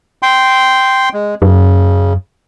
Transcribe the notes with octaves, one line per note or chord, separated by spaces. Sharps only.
G5 C6
G#3
F#2 C#3